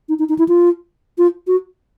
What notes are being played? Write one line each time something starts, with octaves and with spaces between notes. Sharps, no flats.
D#4
D#4
D#4
E4
F4
F4
F#4